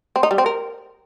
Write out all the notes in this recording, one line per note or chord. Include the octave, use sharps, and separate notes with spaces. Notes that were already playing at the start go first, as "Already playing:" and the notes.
C4
D#4
G3
C4
A#4